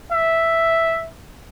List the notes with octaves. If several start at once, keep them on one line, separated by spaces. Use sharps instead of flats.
E5